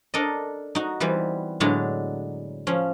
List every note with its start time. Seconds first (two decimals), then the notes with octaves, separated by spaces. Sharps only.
0.14 D4 A4 A#4 D#5
0.75 D#4 F#4
1.00 E3 G3 B3 C4
1.60 A2 D3 F#3 G#3 B3 D4
2.67 F3 C#4